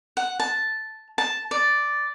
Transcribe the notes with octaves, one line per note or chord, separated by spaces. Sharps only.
F#5
A5
A5
D5